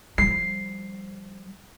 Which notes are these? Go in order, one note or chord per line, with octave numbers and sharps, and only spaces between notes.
F3 G3 C7